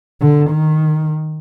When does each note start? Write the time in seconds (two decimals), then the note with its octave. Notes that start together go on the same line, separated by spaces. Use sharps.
0.21 D3
0.50 D#3